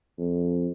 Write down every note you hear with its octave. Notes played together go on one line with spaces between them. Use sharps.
F2